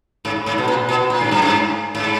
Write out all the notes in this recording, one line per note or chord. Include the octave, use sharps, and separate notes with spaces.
G#2
G#2
B2
A#2
B2
A#2
G#2
G2
G#2
G#2